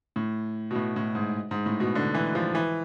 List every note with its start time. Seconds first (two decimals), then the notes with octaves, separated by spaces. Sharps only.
0.16 A2
0.71 B2
0.75 A2
0.96 A2
1.15 G#2
1.51 G#2
1.66 A2
1.80 B2
1.95 D3
2.14 E3
2.35 F3
2.55 E3